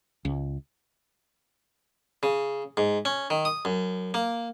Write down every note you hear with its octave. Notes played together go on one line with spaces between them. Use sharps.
C#2
C#3
G#2
C#4
D#3
D#6
F#2
A#3